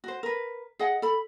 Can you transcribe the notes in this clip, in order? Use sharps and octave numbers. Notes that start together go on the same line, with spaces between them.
F#4 C5
A#4 B4
G#4 D#5 F#5
A4 B5